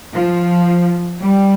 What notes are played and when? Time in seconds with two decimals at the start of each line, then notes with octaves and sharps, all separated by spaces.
0.14 F3
1.19 G3